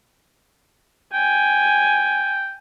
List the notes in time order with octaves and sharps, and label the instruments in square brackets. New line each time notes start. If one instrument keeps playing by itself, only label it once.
[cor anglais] G5 [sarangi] G#5